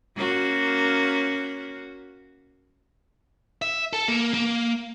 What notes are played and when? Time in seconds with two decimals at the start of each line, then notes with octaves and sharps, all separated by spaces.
0.16 A#3 C#4 F#4
3.62 E5
3.93 A4
4.08 A#3
4.34 A#3